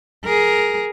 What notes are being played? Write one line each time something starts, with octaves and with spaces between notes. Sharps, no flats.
G#4 A#4